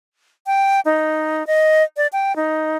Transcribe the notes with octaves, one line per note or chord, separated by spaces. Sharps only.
G5
D#4
D#5
D5
G5
D#4